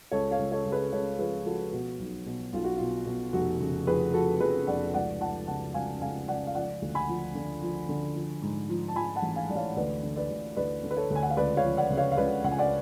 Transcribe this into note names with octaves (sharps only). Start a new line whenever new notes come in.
C#2 A4 C#5
C#5 F5
C#2
A4 C#5
C#2
G#4 B4
C#2 A4 C#5
F3 G#4 B4
F3 F#4 A4
B2 F#4
B1
B2
B1 F4
F#4
B2 F4
B2
F1 F#4
C#3
F2 G#4 B4
F3 F#4 A4
F2 G#4 B4
F1 D5 F#5
C#2 D5 F#5
F3 F#5 A5
C#3 F#5 A5
C#2 F5 G#5
C#2 F5 G#5
C#2 D5 F#5
F5
F3 D5 F#5
D2
G#5 B5
F3
D3
F3
D3
F3
G#2
F3
A5
F3 G#5 B5
F#5 A5
A1
F5 G#5
A1 D5
C#5 F5
D2 B4 D5
D3
B4 D5
D2
D2 B4 D5
D3
B4
A4 C#5
D2
G#5
F#5
F5
C#2 B4 D5
C#5 F5
F3
D5 F#5
C#3
C#5 F5
F5
C#2 B4 D5
C#3 F#5
G#5
D5 F#5